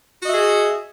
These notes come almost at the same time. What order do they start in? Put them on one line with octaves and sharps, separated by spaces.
F#4 D#5 E5 G#4